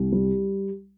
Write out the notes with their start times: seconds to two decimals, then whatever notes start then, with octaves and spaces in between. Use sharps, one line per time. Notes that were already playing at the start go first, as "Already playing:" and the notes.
Already playing: C2
0.12 G3